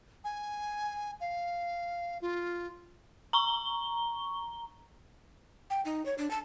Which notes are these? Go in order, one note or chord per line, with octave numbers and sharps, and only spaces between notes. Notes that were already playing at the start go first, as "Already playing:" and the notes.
G#5
F5
F4
A#5 C#6 G7
G5
D#4
C#5
D4
A5